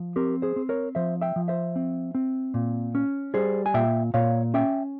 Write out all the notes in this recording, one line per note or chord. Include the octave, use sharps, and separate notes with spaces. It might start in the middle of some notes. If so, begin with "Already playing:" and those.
Already playing: F3
C4 G4 A#4
G#4 C5
C4
A#4 C#5
F3 C5 E5
E5 G5
F3
C5 E5
C4
C4
A#2
C#4
G3 G#4 C5
G#5
A#2 E5 G5
A#2 C#5 F5
C#4 E5 G5